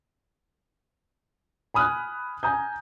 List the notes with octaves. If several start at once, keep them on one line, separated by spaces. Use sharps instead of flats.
G#5 B5 D#6 F6 F#6
G#5 A#5 D#6 G6